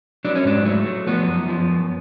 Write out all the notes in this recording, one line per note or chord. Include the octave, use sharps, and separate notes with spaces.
F#3 D4
C#4
G#2 D4
F#3 A3
F#3
F3 B3
F#2
F3
F#2